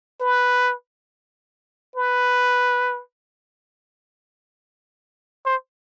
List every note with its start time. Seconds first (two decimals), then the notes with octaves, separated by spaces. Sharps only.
0.21 B4
1.96 B4
5.46 C5